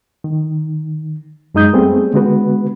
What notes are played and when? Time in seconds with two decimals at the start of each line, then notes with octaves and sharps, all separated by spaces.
0.24 D#3
1.54 F#2 G#3 D#4 D#6 G6
1.73 G3 A3 B3 C4 G#4
2.14 D3 G#3 B3 F#4 B4